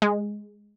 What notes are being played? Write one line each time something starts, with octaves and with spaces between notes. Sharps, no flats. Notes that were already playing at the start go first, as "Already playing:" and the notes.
G#3